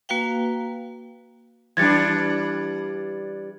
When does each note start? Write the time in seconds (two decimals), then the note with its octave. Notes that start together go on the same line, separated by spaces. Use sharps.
0.09 A#3 F#4 B4 F5 G5
1.77 E3 G3 D4 G#6 A6 C#7